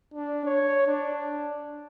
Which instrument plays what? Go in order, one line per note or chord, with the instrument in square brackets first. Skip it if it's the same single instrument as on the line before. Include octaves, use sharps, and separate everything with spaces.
[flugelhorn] D4
C#5
D4